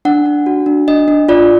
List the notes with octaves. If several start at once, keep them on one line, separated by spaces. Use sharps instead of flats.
D4 F#5
D4
F#4
D4
D4 D#5
D4
F4 D5